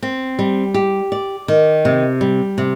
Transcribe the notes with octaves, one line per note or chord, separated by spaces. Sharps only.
C4
G3
G4
D5
D#3
C3
G3
C3